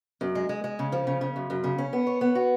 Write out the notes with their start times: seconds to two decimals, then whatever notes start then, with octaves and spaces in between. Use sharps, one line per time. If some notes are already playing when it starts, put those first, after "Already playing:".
0.21 F#2
0.35 G#3
0.49 G#3
0.64 G#3
0.79 C#3
0.92 F3
1.07 C#3
1.21 C#3
1.36 F#2
1.50 F#2
1.64 C#3
1.78 C#4
1.93 B3
2.07 C#5
2.21 B3
2.35 F#4